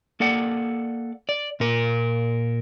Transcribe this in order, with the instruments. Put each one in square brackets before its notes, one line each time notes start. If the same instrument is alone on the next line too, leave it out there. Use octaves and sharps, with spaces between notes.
[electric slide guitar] A#3 A4 D5 F#5
D5
A#2 A#4